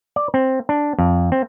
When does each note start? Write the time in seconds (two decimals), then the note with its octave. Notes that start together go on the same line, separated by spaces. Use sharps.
0.16 D5
0.34 C4
0.69 D4
0.99 F2
1.32 C4